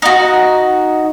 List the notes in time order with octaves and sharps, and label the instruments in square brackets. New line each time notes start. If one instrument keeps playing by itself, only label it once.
[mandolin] D#4 F#4